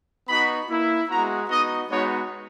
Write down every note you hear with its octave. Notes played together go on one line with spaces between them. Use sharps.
B3 D#4 F#4 B5
A#3 E4
G#3 B3 F#4 A#5
B3 D#4 F#4 D#5
G#3 B3 D#4 F#4 C#5